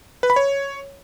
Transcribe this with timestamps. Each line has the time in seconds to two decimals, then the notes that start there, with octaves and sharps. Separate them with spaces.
0.23 B4
0.30 B5
0.36 C#5